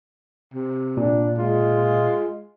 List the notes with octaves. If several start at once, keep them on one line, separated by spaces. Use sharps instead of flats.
C3
A#2 D4
G#3 F4